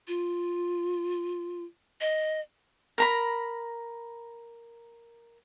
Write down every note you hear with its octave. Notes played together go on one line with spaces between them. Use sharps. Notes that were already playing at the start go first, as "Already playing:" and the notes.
F4
D#5
A#4 A#5 B5